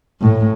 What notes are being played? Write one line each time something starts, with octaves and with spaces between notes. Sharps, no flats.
A2